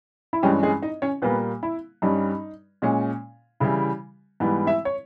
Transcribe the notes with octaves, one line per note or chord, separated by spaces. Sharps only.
E4
G2 E3 G3 G#3 C#4 G4
G#3 G#4
D#4 D#5
C#4 C#5
A#2 G3 A#3 B3 B4
E4
G2 G3 C#4 D#4
A#2 G#3 C#4
C#3 E3 G3 E4
G#2 E3 G3 B3
E4 E5
C#5